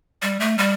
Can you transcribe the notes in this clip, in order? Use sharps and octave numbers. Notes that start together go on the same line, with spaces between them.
G3
A3
G3